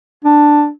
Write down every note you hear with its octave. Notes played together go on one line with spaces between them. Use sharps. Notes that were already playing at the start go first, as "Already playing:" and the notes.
D4